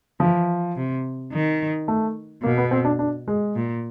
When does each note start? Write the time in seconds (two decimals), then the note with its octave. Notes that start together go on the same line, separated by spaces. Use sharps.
0.20 E3 F3
0.76 C3
1.32 D#3
1.88 A3
2.43 B2 A#3
2.58 B3
2.71 C4
2.85 D4
2.99 D4
3.28 G#3
3.56 A#2